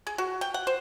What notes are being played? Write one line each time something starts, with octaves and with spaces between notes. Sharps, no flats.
G#4
F#4
G5
F#5
C5